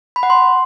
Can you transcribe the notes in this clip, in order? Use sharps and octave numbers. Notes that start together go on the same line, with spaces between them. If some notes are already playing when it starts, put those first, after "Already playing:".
B5
F#5
C6